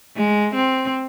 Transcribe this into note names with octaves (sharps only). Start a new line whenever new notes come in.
G#3
C4